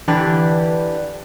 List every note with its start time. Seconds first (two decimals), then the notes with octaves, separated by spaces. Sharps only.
0.08 D3 E3 D4 G4 B4